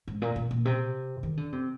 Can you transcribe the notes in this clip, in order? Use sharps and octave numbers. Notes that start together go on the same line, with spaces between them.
G#2
A#2
A#2
A#2
C3
D#3
D3
C3